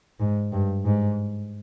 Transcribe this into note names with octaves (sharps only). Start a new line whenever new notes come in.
G#2
G2
G#2